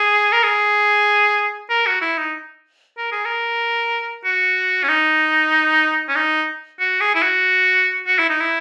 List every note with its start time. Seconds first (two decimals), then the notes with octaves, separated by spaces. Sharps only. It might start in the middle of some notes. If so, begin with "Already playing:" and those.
Already playing: G#4
0.32 A#4
0.43 G#4
1.70 A#4
1.87 F#4
2.02 E4
2.18 D#4
2.97 A#4
3.12 G#4
3.25 A#4
4.25 F#4
4.83 C#4
4.89 D#4
6.08 C#4
6.15 D#4
6.80 F#4
7.01 G#4
7.15 E4
7.23 F#4
8.07 F#4
8.19 E4
8.30 D#4
8.40 E4